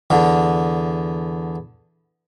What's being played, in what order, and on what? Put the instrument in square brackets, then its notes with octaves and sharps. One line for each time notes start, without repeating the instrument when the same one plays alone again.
[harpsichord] E2 D3